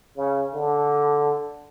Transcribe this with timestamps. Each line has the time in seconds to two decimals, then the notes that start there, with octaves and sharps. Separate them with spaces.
0.17 C#3
0.54 D3